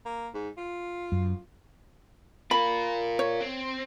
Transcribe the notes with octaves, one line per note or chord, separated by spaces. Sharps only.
A#3
G#2
F4
F#2
F4 A#4 B5
C#5
C4